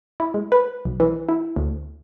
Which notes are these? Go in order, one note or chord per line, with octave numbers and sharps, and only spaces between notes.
E4
G#3
B4
B1
E3
E4
D2